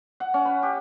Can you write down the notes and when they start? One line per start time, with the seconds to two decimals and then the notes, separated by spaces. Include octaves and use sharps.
0.20 F#5
0.34 C#4
0.45 B4
0.63 G4